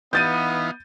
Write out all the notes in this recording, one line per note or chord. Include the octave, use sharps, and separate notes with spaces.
E3 B3 D#4 F5 G6 A6 D#7